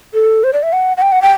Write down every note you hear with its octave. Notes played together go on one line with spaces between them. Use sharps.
A4
C5
D5
E5
F#5
F#5
G5
F#5
G5